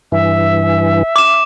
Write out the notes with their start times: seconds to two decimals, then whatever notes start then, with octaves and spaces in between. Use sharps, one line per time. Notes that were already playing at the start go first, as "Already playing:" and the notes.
0.12 G2 E3 E5
1.16 D6 F6 E7